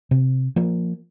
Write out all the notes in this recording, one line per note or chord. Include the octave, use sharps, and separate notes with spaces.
C3
F3 A#3